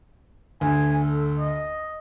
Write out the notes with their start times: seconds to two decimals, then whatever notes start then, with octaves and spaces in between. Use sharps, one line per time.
0.61 D2 G#5
1.02 A4
1.38 D#5